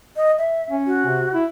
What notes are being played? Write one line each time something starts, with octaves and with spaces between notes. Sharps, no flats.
D#5
E5
C#4
F#4
C3
E4